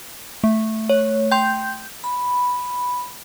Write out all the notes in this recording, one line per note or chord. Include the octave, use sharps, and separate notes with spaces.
A3
C#5
G5 C6 G6
B5